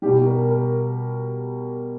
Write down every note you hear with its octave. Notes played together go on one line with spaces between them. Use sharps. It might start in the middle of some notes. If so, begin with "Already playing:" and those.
B2 G3 G4
A#4
A#4